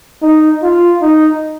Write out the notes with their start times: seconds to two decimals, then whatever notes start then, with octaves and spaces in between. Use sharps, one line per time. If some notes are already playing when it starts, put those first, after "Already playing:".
0.22 D#4
0.62 F4
1.02 D#4